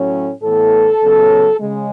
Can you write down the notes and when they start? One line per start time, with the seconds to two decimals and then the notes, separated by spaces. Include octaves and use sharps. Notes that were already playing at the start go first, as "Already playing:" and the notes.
Already playing: A2 F#3 A3 C#4
0.43 A2 E3 B3 A4
1.01 C#3 F#3 B3
1.60 C#3 G#3